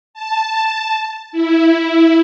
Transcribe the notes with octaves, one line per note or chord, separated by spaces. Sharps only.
A5
E4